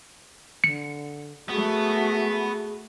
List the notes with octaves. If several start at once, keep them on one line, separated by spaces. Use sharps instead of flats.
D3 C#7
A3 B3 F#4 G#4